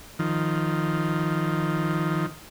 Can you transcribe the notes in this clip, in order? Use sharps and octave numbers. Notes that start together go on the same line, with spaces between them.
D#3 F3